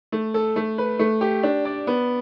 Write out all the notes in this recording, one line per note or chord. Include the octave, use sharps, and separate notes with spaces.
A3
A4
A3
B4
A3
G4
D4
D5
B3